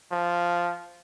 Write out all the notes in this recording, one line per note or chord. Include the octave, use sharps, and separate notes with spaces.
F3